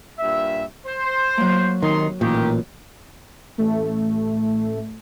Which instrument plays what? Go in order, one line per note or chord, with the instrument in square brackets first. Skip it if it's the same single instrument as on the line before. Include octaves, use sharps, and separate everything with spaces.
[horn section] G2 A#2 E5
C5
[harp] F#3 A#3
[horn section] C3 D#4 C6 [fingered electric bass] D#3
[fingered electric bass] A1 A#2 [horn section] D#3 G4
[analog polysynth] A1 A3